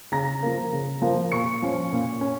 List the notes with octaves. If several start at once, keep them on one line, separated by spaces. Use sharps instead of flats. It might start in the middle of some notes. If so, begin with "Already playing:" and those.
C#3 A#5 A#6
F3 A#3
C#3
F3 A#3
A#2 C#6 C#7
F3 C#4
A#2
C#4